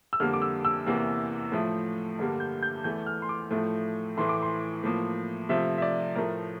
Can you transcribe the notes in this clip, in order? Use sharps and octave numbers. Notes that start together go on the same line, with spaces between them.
E6
F2 D3 G3 A#3 F6
D6
E6
E6
E2 C3 E3 A#3
A2 F3 A3
G2 D3 G3 A#3
G6
G6
E2 E3 A3 G6
F6
C6
D6
A2 F3 A3
A2 E3 A3 C6
D6
C6
A2 F3 A#3
C3 F3 A3 E5
E5
D5
A2 F3 A3 A#4